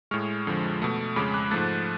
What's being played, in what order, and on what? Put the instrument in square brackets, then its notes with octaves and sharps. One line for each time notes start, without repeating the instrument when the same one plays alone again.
[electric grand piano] A2 G#3 C#6 F6
F2 D3 F3 G#3
B2 A3
F2 C#3 G#3 B5 D6
D6 F#6
G#2 F3 A3 F#6 A6